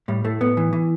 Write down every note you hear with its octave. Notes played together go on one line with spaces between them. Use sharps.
A2 G3
A2 A3
A2 B3
E3
E3